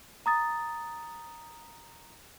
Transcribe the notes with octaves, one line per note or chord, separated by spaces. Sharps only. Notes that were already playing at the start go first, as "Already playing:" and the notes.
A#5 D#6 A6